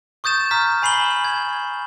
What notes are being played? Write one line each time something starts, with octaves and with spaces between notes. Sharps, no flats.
C#6 D#6 G6 A6 E7
A#5 D#6 F6 B6
G#5 B5 C7 E7 F#7 G7
G#6